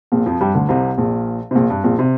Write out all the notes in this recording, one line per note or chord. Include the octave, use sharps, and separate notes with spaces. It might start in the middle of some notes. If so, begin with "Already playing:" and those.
A#1 A#2
F2 F3
G2 G3
D2 D3
C2 C3
A#1 A#2
C3
A#1 A#2
G2
A#1 A#2
C3